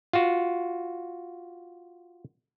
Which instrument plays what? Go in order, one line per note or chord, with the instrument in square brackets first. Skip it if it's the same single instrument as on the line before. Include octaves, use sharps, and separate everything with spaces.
[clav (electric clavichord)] F4 F#4